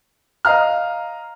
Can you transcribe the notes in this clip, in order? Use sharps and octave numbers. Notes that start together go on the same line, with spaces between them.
D#5 F5 A#5 F6